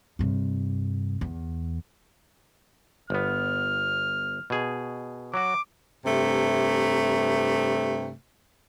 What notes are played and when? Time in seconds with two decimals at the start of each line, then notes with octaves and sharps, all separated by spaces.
0.19 G2 C3
1.21 E2
3.10 G1 B3 F6
4.50 B2 G#4
5.34 F#3 F#4 D6
6.06 G2 C3 A3